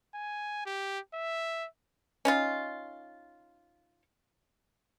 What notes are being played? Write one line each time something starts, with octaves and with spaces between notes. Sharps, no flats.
G#5
G4
E5
C#4 D#4 F4